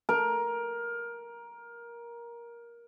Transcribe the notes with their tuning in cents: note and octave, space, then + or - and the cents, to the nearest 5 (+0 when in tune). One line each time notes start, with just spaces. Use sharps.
A#4 +15